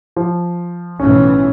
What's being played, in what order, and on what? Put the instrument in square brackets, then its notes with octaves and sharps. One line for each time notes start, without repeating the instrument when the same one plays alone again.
[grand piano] F3
[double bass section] B1 A2 E3 [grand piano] C#4